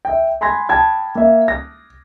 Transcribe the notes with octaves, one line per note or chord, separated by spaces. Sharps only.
E5 G5
G#5 B5 C6 G#6 A#6
G5 A5 B5 G#6
A#3 E5
A#6